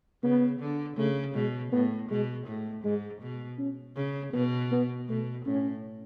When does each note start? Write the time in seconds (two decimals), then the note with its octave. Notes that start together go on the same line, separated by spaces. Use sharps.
0.23 C#3 B3
0.60 D3
0.97 C#3 A3
1.35 B2 G#3
1.72 A2 B3
2.10 B2 G#3
2.47 A2
2.84 G#2 G#3
3.22 B2
3.58 C#4
3.96 C#3
4.33 B2 B3
4.71 B3
5.09 B2 A3
5.46 A2 C#4